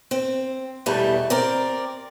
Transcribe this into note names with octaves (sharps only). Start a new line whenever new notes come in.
C4
E2 B2 G3 A3
C4 A#4 D5